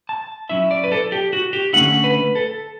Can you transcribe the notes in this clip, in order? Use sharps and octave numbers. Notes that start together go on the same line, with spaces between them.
A5
F#3 C#4 E4 E5
D5
B4
A4
G4
F#4
G4
D3 A3 C#4 E4 F#5
B4
A4